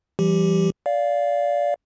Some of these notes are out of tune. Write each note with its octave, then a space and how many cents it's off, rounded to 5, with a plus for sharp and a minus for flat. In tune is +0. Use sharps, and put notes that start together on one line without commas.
E3 +45 G3 +0 G4 +0
D5 -20 F5 +0